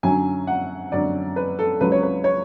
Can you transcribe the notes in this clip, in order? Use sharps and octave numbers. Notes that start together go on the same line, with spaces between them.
F#2 D3 F#3 C#4 G#5
F#5
F#2 D3 F#3 C#4 D5
B4
A4
C#2 C#3 F#3 B4
C#5
B4
C#5